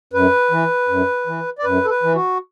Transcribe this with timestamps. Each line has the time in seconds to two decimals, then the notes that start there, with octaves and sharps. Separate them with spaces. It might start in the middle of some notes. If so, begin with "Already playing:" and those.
0.13 F#2 B4
0.51 E3
0.89 F#2
1.27 E3
1.59 D5
1.64 F#2 B4
1.85 A4
1.90 B4
2.03 E3
2.15 F#4